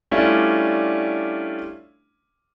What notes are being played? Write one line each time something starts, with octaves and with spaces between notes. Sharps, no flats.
G3 A3 C#4 D4 E4 F4